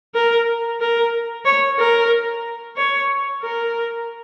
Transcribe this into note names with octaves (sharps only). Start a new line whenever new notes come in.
A#4
A#4
C#5
A#4
C#5
A#4